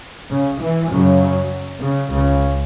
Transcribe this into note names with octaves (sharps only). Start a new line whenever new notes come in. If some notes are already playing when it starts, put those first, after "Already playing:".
C#3
E3
F#2 C#3 F#3
C#3
C#2 C#3